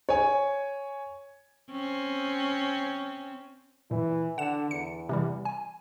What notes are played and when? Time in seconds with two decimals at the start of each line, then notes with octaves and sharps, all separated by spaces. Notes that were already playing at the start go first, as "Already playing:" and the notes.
0.09 C#5 G#5
1.72 C4 C#4
3.91 A#2 E3
4.38 D3 F#5 E7
4.71 E2 C#7
5.09 C3 E3 G3
5.45 G#5